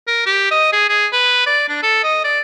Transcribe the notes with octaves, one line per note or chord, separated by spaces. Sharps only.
A#4
G4
D#5
G#4
G#4
B4
D5
D4
A4
D#5
D5